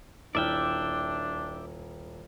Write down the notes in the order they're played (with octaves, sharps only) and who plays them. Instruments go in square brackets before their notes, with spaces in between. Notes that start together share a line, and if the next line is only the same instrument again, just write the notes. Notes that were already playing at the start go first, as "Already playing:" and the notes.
[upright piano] D#1 E4 F6 [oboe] D4 [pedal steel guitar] D5 E5 G5